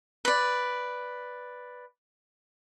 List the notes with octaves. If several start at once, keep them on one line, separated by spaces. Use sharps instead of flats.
B4 D5